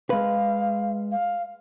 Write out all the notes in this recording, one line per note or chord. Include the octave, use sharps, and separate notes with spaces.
G#3 B4 F5
F5